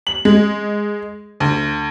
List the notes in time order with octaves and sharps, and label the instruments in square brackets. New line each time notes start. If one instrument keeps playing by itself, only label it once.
[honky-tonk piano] F#7
G#3
D2